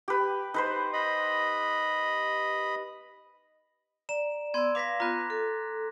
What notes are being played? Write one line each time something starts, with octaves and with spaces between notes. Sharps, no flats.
G4 B4
D#4 B4 C5
D#5 B5
D5 A#5 E7
B3 D5 C6 E6 G#6
B4 F5 D6 A#6 B6
B3 F4 A#5 F#6
A4